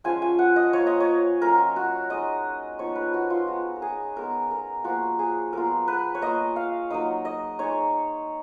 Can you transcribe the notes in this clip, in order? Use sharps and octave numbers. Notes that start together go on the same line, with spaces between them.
F3 G#3 C#4 F4 G#5
G#5
F#5
D#5
A#3 F4 C#5
D#5
C#5
F#3 C#4 F4 A#4
F#4
G#3 D#4 D#5
F3 B3 D#4 C#5
B4
F#4
F4
G#3 D#4 F#4
A#4
G#4
G#3 B3 D#4 A#4
A#4
F3 A#3 F4 F#4
G#4
F#3 B3 F4 A#4
B4
C#5
A#3 F4 D#5
F5
F#3 A#3 D#4 D#5
D#5
G#3 D#4 C#5